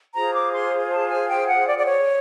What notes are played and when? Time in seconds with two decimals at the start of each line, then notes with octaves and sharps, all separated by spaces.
0.14 F4 G#4 C5 A#5
0.34 D6
0.53 C6
0.91 A5
1.09 G#5
1.29 G5
1.47 F#5
1.66 D5
1.78 D5
1.86 C#5